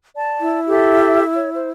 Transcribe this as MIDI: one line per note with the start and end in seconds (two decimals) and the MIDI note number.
0.15 0.59 74
0.15 0.59 81
0.41 1.72 64
0.69 1.24 67
0.69 1.24 69
0.69 1.24 76
1.34 1.50 73
1.53 1.68 72